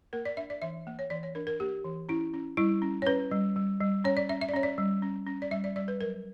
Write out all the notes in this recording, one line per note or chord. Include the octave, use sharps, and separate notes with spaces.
A#3 A#4
D5
D4 E5
D5
E3 E5
A#3
C#5
E3 D5
C#5
D4 A#4
A#4
A#3 G4
E3
C#4 E4
C#4
G3 E4
C#4
C#5
C#4 B4
G3
G3
G3
C#4 C#5
D5
C#4 E5
E5
D5
C#4 C#5
D5
G3
C#4
C#4
D5
G3 E5
D5
G3 D5
B4
F#3 A#4